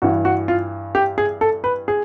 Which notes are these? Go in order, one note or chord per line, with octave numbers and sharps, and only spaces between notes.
G2 E3 F#4
F#4
F4
G4
G#4
A4
B4
G#4